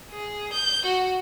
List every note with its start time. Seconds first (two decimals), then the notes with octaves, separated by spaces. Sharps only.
0.11 G#4
0.53 G6
0.85 F#4